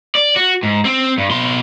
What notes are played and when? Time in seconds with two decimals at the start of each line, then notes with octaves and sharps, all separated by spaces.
0.15 D5
0.36 F#4
0.63 G#2
0.85 C4
1.18 G2
1.30 B2 C6